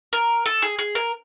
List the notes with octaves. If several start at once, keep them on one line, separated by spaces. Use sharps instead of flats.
A#4
A4
G#4
G#4
A#4